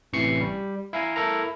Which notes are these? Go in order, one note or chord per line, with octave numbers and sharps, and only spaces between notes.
A1 C3 E3 C#6 C7 C#7
G3
E4 F5 G#5 A#5
E4 A4 A#4 A#5